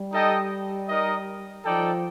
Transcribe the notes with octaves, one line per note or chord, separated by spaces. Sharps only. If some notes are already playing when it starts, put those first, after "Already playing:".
Already playing: G3
D#4 A4 D#5 G5
D#4 A#4 D#5
F3 D#4 A4 D5 G5